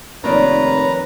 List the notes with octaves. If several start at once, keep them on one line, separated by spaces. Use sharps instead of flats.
F1 D#3 A#3 B4 C#5 D5 A#5